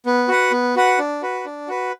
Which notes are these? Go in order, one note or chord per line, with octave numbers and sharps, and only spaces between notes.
B3
F#4 B4 F#5
B3
F#4 B4 F#5
D4
F#4 B4
D4
F#4 B4